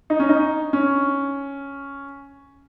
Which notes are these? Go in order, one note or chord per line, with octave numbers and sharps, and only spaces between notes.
D#4
C#4
D#4
C#4